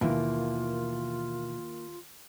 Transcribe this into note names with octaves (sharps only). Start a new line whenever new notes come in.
D#2 B2 E3 A#3 F4